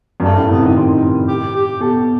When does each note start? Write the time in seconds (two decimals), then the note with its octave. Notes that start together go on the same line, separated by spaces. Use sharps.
0.20 F#2
0.23 G2 A3
0.37 A2
0.50 C3 B3
0.63 D#3
0.66 D#4
0.76 C3 C4
0.90 D#4
1.28 G4
1.55 G4
1.80 B2 A4